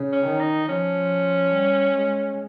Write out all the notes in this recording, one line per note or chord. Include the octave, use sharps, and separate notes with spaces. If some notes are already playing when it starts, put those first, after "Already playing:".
Already playing: C#3
C#4
D#3
D#4
F3 C#4
G3
G#3